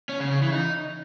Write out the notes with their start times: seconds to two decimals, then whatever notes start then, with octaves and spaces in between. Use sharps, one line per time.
0.09 C#4
0.20 C#3
0.31 C#3
0.42 E3
0.53 D#4